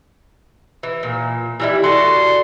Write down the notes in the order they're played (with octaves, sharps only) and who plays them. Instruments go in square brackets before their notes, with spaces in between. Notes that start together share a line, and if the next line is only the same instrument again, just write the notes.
[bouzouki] E3
A#2
E3 G3 E4
[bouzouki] F#4 A4 D5 [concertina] C6